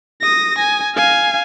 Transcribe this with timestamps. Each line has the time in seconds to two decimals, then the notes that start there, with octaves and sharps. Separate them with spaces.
0.21 D#6 A#6
0.58 G#5
0.96 F5 G#5